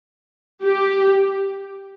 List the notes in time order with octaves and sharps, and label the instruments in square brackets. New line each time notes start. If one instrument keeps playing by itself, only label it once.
[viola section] G4